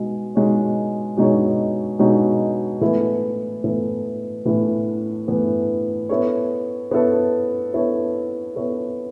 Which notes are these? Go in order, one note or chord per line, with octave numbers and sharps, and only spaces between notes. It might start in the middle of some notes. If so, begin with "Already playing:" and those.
Already playing: B2 G#3 D#4
B2 G#3 D#4 G#4 C#5
B2 G#3 D#4 G#4 C#5
B2 G#3 D#4 G#4 C#5
A2 E3 B3 E4 A4
A2 E3 B3 E4 A4
A2 E3 B3 E4 A4
A2 E3 B3 E4 A4
B3 E4 A4 C#5
B3 E4 A4 C#5
B3 E4 A4 C#5
B3 E4 A4 C#5